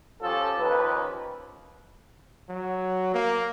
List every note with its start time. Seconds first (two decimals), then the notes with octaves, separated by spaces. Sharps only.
0.21 F3 C#4 F4 G4 A4
0.58 D#2 F3 C#4 B4
2.49 F#3
3.14 A#3